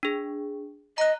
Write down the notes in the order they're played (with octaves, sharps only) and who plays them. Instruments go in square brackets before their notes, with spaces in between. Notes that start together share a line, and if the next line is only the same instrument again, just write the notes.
[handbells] D4 G#4
[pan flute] D#5 [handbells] A#5 F#6